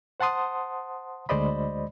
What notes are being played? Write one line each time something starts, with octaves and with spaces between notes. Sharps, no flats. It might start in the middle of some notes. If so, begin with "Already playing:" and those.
C5 F#5 A5 C6 D#6
D2 G#3 C5 D5 D#5 B5